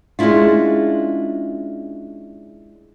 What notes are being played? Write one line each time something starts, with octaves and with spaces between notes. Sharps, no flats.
G#3 C#4 D4 E4 F4